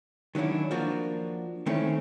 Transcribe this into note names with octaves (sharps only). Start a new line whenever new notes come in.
D#3 F#3 C#4 D4 E4
F3 A#3 D4 F#4
D#3 A3 C4 C#4 E4